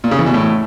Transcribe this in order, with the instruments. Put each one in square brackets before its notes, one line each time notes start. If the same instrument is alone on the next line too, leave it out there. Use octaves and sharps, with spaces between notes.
[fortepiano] A#2
C#3
E3
B2
A2